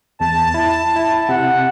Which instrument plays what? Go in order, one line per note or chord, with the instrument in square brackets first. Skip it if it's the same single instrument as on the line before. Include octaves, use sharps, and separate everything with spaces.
[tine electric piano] E2 [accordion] A5
[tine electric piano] E4
E4
[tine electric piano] C3 [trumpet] F#5